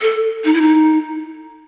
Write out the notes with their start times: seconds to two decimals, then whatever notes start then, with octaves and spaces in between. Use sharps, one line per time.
0.02 A4
0.44 D#4
0.54 E4
0.61 D#4